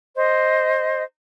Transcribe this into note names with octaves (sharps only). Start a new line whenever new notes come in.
C5 D#5